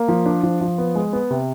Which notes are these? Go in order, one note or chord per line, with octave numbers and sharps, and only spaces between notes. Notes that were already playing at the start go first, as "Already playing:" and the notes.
Already playing: A#3
F3
D4
F3
F3
B3
G#3
B3
C3